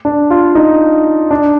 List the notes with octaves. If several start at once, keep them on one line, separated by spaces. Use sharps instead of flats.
D4
F4
D#4
D4